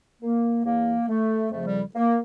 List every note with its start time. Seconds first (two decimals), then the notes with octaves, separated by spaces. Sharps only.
0.22 A#3
0.65 E2 E3 A#3
1.08 A3
1.51 F2 C#3 F3 A3
1.65 G3
1.95 A#3